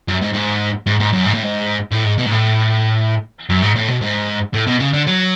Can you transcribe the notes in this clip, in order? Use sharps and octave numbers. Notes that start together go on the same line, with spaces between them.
F#2
G#2
G#2
G#2
G#2
F#2
G#2
A2
G#2
A2
G#2
B2
G#2
A2
F#2
G#2
A2
B2
G#2
A2
B2
C#3
D3
F#3